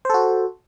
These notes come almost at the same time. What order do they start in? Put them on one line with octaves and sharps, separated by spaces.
C5 A4 F#4